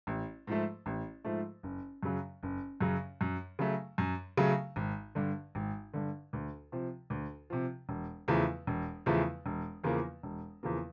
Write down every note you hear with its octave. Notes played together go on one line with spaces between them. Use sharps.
A1
G#2 F3 A3
A1
G#2 F3 A3
F#1
F#2 C#3 F#3
F#1
F#2 C#3 F#3
F#2
C#3 F#3 A3
F#2
C#3 F#3 A3
G#1
G2 D3
G#1
G2 D3
D2
C3 F3
D2
C3 F3
E1
E2 C#3 F3 A3
E1
E2 C#3 F3 A3
E1
E2 C#3 F3 A#3
E1
E2 C#3 F3 A#3